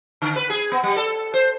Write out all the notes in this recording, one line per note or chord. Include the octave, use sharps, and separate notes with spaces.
D3
B4
G#4
B3
G3
A4
C5